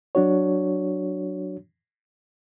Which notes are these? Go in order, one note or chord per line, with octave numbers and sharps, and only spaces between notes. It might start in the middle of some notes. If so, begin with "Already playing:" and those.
F#3 D4 F#4 C#5